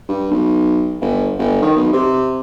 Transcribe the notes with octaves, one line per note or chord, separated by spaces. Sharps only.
G2
B1
G1
G1
D#3
B1
C3